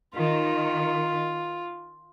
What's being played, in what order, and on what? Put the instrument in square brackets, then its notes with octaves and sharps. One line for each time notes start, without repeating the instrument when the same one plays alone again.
[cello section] D#3 [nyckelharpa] F4